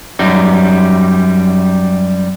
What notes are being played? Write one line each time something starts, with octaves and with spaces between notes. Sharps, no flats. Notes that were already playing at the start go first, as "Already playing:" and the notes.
F#2 G3 D#4